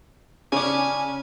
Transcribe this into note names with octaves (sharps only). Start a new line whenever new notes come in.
C#3 C#4 D4 G#5